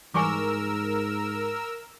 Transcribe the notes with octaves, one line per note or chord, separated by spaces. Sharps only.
G#2 E3 G3 A#4 G#5 C#6 D6 E6